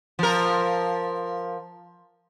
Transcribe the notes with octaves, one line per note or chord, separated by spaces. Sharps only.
F3 A#4